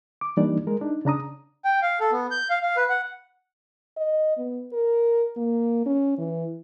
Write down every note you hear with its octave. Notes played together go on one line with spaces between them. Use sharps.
D6
E3 G3 A#3 D4 D#4 D5
G#3 A#4
D4 D#4
C#3 D4 A#5 D#6
G5
F5
A4
B3
G6
F5
F5
B4
F#5
D#5
B3
A#4
A#3
C#4
E3